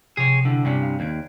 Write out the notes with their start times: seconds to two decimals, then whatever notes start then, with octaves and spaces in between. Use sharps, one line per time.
0.17 C3 F3 G#4 C#5
0.45 D3 G3 E4
0.65 G2 C3 C#4 D5 B6
0.83 F5
1.00 D#2 G#6 D7